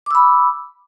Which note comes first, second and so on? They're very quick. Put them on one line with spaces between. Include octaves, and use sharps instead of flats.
D6 E6 B5